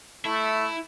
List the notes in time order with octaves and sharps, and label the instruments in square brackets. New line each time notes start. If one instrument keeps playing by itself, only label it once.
[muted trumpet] A3 [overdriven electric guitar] E4